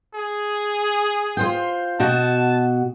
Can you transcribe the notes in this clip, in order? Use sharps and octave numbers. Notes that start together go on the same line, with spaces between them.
G#4
F4 C5 G5
B2 F#4 G5 A5